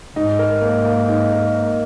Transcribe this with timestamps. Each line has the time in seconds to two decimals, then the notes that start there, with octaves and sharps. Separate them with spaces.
0.15 G#2 D#4
0.39 A#4
0.61 A#3
0.85 A#3
1.09 D#4
1.31 A#4
1.55 A#3